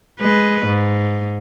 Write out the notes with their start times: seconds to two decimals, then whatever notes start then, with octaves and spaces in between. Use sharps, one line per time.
0.20 G#3 B4
0.66 G#2